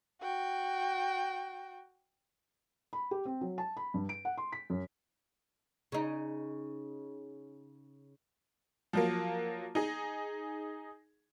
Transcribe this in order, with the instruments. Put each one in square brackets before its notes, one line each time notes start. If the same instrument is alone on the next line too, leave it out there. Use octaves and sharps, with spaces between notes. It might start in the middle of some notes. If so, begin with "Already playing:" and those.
[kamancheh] F#4 G5
[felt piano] B5
G4
C4
F#3
A5
B5
G2
D7
F#5
C6
B6
F#2
[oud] C#3 D#4
[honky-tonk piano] F3 F#3 A#3
D#4 G#4